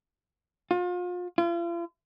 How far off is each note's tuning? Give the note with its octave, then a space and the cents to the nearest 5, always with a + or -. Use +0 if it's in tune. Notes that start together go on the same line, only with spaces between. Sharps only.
F4 +35
F4 -40